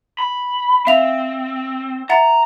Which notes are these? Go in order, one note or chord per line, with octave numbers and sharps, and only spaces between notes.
B5
C4 E5 F5 F7
E5 F#5 A#5 A6